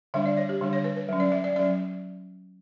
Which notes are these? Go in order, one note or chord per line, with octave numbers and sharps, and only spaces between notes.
D3 G3 D4 E5
D5
C#5
G4
D3 G3 D4
C#5
B4
B4
F#3 C#4
D5
E5
D5
F#3 C#4 D5